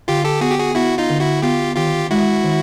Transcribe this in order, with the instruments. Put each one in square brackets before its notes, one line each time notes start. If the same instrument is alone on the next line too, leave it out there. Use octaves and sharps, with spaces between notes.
[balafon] D3 [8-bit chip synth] F4 G4
[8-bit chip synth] G4 A4
[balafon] B3 [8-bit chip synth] F#4 G#4
[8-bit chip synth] G4
F#4 G#4
[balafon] B3 [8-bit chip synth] E4 F#4
[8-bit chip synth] D#4 F4
[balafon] D3
[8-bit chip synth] E4 F#4
[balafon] B3 [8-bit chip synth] F4 G4
[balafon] D#3 [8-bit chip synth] F4 G4
[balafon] G#3 [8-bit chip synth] E4 F#4
[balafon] D#3